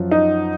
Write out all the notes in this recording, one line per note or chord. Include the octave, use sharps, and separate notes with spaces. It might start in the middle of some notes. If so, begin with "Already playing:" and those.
Already playing: F#2 F3
D#4